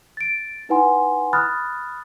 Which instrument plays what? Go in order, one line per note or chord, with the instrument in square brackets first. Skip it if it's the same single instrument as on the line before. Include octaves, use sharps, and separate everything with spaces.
[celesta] A6 D7
D#4 E4 B4 F#5 G#5 C6
B5 D#6 F6 F#6 A6